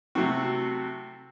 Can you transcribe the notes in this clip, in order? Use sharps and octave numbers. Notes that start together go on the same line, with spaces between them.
C3 F#3 A3 C4 F#4